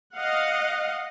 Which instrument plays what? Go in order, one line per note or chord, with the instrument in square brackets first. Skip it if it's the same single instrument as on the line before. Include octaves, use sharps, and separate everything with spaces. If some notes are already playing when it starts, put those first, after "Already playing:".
[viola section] D#5 F5 F#5